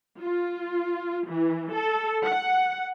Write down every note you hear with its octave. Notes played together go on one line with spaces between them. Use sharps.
F4
E3
A4
F#5